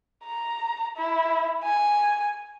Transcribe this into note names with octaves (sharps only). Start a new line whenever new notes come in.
A#5
E4
G#5